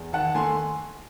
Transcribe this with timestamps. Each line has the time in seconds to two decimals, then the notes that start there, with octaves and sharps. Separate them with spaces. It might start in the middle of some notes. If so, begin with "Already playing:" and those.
Already playing: E2
0.13 D#3 F#5 A5
0.35 A3 G#5 C6